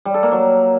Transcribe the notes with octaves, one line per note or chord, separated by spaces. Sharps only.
G3
A4
A#3
F#3